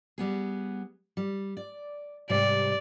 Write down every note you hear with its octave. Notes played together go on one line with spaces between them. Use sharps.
G3 B3 G#4
G3
D5
G#2 C3 G3 D5